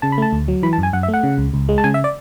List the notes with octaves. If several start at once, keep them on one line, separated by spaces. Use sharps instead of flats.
C#3 A5
B5
A3 A5
D2
F#3
E3 B5
A5
F#2
G#5
F#2 F#5
E5
A3
F#5
C#3
C#2
C#2
G#3
A5
C#3 G#5
E5
D5